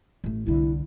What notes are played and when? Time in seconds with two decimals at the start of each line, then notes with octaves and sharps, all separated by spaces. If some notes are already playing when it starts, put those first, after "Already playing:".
0.24 A1 A3
0.46 C2 D3 E4